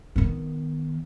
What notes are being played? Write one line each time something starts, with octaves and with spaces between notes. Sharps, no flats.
D#3 B3